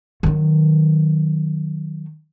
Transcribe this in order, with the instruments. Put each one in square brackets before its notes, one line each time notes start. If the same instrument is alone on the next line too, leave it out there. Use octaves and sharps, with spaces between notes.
[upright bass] D#3 F#3